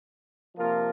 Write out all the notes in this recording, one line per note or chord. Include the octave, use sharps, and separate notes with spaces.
C3 F3 A#3 F4 A#4